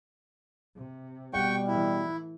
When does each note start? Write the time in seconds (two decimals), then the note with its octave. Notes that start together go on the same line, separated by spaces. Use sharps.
0.76 C3
1.33 B2 G3 F#5 G5 C#6
1.67 A2 E3 E4